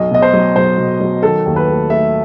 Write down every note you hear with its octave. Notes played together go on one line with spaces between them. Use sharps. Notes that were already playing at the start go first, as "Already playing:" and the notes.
Already playing: B1 D#5
B2 D#5
C5
F#3
B1 C5
B2
F#3
D#3 A4
D#2
B4
A3
A3 E5